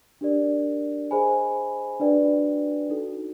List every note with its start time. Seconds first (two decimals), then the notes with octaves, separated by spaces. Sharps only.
0.21 D4 G4 A#4 D5
1.11 G#4 C5 D#5 G#5 B5
2.00 D4 F#4 B4 D5 G5
2.90 D#4 F#4 A4